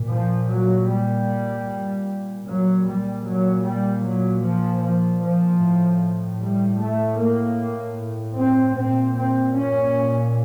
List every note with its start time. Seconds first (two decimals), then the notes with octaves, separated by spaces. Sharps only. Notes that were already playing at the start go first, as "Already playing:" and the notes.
Already playing: A#2
0.10 F3
0.50 F#3
0.89 G3
2.46 A#2 F#3
2.85 G3
3.25 F#3
3.64 G3
4.04 F#3
4.43 F3
4.81 F3
5.21 F3
5.60 A2
6.40 G3
6.79 A3
7.17 A#3
8.35 C4
8.75 A#2 C4
9.15 C4
9.54 C#4